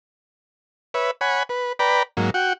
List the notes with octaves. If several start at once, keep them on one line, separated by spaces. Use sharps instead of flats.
B4 C#5 E5
C#5 F#5 G#5 B5
B4
B4 D5 G5 A#5 B5
G#2 F#3 A#3
F#4 F#5 G5